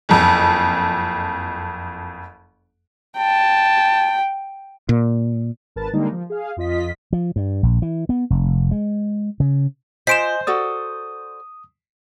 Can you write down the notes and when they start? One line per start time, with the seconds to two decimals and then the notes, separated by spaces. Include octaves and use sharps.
0.09 F#1 F2
3.17 G5 A5
4.89 A#2
5.76 G#1 A#4 B4 A5 A6
5.93 D3 D#3 G3 G#3 A#3 D#4
6.12 F3
6.30 G#4 F5
6.57 F2 F4 D#5 B6
7.13 F3
7.36 G2
7.63 A#1
7.82 E3
8.09 B3
8.30 F1
8.71 G#3
9.40 C#3
10.07 F4 C5 D#5 G#5 C6 B6 D7 E7
10.47 F#4 A4 D5 D#6